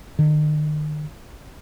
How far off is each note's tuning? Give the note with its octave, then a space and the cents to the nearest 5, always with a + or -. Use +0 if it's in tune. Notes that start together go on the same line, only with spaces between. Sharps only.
D#3 -45